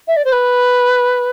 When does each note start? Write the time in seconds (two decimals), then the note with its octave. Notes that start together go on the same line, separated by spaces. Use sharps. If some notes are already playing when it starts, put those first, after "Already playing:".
0.08 E5
0.16 D5
0.25 C5
0.32 B4